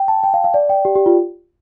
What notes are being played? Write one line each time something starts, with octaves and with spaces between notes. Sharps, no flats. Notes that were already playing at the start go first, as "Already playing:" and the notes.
Already playing: G5
A5
G5
F5
F5
D5
G5
G4
G4
F4